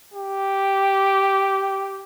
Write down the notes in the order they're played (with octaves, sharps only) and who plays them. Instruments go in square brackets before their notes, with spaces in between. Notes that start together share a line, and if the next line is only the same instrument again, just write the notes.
[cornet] G4